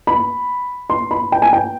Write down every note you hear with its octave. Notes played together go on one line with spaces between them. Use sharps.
B5
C6
B5
G5
G#5
G5